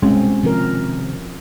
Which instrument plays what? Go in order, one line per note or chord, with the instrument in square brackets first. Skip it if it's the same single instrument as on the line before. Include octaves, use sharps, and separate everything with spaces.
[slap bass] C2 F#2 [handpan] B2 C4 C#4 [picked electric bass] G#3
[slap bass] C3 D#3 C4 [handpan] F3 A#4